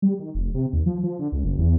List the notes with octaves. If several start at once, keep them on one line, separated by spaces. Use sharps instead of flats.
G3
D#3
F1
C3
D#2
F3
F3
D3
C#2
F#1
E2